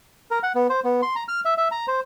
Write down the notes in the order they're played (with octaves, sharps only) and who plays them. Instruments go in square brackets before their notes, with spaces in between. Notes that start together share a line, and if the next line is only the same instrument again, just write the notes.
[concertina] A#4
F#5
B3
C5
B3
C6
A#5
F6
E5
E5
A#5
C5